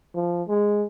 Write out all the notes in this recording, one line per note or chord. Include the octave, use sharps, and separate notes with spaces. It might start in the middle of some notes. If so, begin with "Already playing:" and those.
F3
G#3